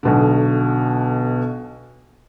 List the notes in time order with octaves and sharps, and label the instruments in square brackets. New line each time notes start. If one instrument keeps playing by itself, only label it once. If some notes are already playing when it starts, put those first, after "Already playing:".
[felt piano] B1 B2 D3